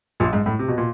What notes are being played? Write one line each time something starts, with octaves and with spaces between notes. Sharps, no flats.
A#1 A#2
G#2
A2
C3
B2
A#2